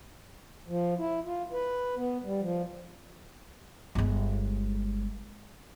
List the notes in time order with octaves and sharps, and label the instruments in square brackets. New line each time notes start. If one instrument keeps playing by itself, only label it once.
[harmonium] F3
E4
F4
B4
B3
G3
F3
[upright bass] G1 G#3